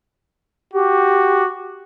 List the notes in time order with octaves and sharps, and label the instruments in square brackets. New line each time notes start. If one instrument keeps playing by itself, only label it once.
[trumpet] F#4 [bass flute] G4